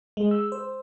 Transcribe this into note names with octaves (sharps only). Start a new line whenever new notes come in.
G#3
E6
C5